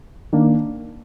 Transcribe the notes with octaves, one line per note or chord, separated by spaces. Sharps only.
D#3 A#3 D4